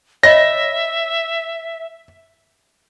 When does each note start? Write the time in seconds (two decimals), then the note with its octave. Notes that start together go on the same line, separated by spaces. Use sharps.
0.23 C#5 D#5 E5 B5 A#6